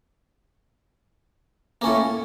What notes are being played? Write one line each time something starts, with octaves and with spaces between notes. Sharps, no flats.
A2 A#3 C#4